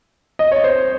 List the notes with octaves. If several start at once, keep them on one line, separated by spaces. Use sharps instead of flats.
D#5
C#5
C5